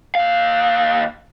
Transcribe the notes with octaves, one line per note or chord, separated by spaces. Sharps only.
D#2 F5